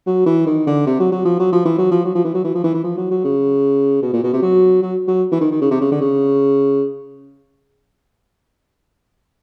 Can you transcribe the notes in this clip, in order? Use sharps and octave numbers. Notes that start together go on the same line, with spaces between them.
F#3
E3
D#3
D3
C3
F#3
F#3
F3
F#3
F3
E3
F#3
F3
F#3
F3
E3
F#3
E3
F3
E3
E3
F3
F#3
F#3
C#3
B2
A#2
B2
C3
F#3
F#3
F#3
E3
D#3
D#3
C#3
C3
C#3
D3
C#3